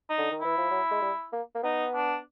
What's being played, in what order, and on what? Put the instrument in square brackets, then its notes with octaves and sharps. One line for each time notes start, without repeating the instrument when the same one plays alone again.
[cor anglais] D#4
[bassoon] D3
D#3
[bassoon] E3 [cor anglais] E4
[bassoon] F3
F#3
G#3
G3
A#3
A#3
[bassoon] B3 [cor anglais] D#4
[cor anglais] D4